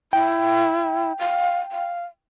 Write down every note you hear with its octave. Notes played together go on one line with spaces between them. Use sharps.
E4 G5
F5
F5